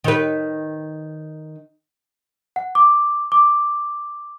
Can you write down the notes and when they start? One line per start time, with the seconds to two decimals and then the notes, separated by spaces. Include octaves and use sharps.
0.04 D#3 B4
2.56 F#5
2.75 D6
3.32 D6